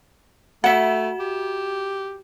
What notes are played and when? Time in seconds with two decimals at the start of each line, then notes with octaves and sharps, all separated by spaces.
0.64 A3 F#4 E5 F#5 E7
1.20 G4